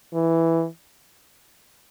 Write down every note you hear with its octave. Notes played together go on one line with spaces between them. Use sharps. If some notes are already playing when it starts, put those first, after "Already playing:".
E3